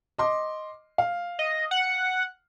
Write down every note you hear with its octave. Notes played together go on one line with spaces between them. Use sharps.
D#5 C6 D6
F5
D#5
F#5